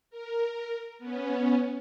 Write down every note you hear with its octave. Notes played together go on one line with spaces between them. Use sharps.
A#4
B3 C#4